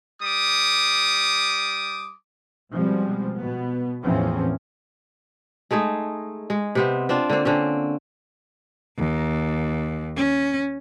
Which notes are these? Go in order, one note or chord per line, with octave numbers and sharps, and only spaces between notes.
G3 D6 D#6
B2 F3 G3 G#3 C4
B2 B3
E2 A2 E3 F3 C4 C#4
G#3 A3 D#4 G#4
G#3
C3 B3 C4
C4 D4 F4
D3 A#3 C4
D3 C4 C#4
D#2
C#4